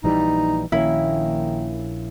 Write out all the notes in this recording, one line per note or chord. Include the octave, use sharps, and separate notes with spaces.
A#1 E3 G3 D#4
A#1 D#3 A#3 C#4 E4